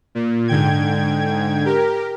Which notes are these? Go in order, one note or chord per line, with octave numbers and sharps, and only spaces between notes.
A#2
G#2 D3 G5 G#6
G4 A#4